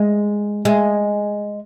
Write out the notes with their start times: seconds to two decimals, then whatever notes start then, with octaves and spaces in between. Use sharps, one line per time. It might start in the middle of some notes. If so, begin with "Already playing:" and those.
Already playing: G#3
0.65 G#3